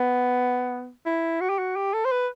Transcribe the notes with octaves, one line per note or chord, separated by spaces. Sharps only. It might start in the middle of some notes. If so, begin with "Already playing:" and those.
Already playing: B3
E4
F#4
G4
F#4
G4
A4
C5
B4